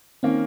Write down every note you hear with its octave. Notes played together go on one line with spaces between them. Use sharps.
D#3 A#3 C4 C#4